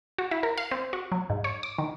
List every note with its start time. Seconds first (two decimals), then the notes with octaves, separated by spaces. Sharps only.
0.18 F#4
0.31 E4
0.43 A#4
0.58 F5
0.71 C4
0.93 F#4
1.12 F#3
1.30 G#2
1.44 C#5
1.63 D6
1.78 D#3